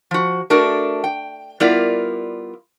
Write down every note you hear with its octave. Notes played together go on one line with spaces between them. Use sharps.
F3 F#4
A3 D4 F#4 A#4
G5
G3 B3 E4 F4 A#4 D5